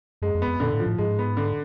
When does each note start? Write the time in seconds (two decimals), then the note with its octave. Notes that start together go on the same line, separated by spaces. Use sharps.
0.22 F#2 G#3
0.35 F2
0.42 B3
0.48 F2
0.60 A#2 D3
0.73 A2
0.80 F3
0.86 A2
0.98 G#2 G#3
1.19 B3
1.37 D3